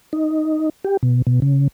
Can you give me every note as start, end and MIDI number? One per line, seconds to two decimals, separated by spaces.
0.13 0.70 63
0.84 0.97 67
1.03 1.22 47
1.27 1.40 47
1.42 1.68 49